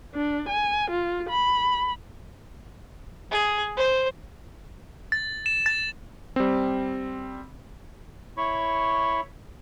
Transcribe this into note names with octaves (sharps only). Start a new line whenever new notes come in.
D4
G#5
F4
B5
G#4
C5
A6
E7
A6
G3 C4
E4 C#5 B5 C#6